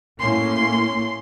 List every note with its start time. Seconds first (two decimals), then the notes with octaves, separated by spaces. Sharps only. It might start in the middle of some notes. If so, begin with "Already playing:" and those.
0.20 A2 A#3 C#4 C6